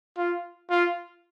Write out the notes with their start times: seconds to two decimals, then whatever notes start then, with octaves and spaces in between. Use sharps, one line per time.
0.17 F4
0.70 F4